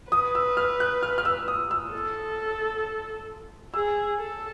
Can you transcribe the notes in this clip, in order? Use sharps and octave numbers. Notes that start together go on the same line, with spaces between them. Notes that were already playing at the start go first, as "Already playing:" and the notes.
B4 D#6
E6
F6
F#6
F6
F6
E6
D#6
E6
A4
G#4 E6
A4